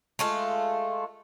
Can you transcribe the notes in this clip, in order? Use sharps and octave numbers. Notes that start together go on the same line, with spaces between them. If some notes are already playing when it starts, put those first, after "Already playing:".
G#3 A3 F4